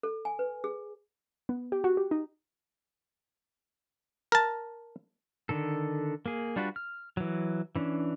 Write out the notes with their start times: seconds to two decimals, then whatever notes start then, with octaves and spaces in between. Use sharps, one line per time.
0.03 A4
0.25 G#5
0.39 B4
0.64 G#4
1.49 B3
1.72 G4
1.84 F#4
1.97 G4
2.11 D#4
4.32 A#4 A5
5.49 D3 D#3 A4
6.26 A#3 G#4
6.56 G3 D4 F4 F#4 B4
6.76 F6
7.17 E3 F#3
7.76 E3 C#4 D4